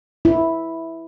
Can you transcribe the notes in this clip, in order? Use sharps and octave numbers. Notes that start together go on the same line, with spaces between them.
E4